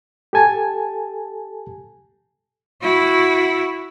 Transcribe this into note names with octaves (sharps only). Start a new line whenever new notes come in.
G4 A4 G#5 A5
E4 F#4